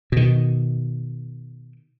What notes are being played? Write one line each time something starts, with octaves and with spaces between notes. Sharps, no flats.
B2 D#3